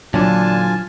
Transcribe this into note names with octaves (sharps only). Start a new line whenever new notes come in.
A#2 D3 E3 F#3 D4 F4 G#5 A5